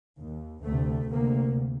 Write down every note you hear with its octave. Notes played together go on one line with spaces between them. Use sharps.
D#2
D2 C3 A3
D2 C3 A#3